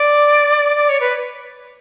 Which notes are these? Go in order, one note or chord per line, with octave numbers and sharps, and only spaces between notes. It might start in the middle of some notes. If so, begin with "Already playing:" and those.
Already playing: D5
D5
C#5
B4